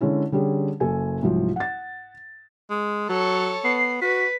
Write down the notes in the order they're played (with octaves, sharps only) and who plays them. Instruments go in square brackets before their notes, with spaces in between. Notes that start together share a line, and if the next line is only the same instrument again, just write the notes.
[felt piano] D3 G#3 C#4 E4
D3 G3 C#4 G#4
F#1 A4 G#5
C2 G#2 F3 F#3
F#5 A6
[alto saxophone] G#3
[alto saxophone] F#3 [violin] A4 C#5
[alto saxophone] B3 [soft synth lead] C7
[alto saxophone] F#4 [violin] B4 [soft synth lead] B6